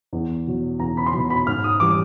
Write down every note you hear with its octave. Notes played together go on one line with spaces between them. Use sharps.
E2
B2 F#3
E2 A#5
B5
C6
B2 F#3 B5
B5
G#2 F6
D#6
E3 G3 D6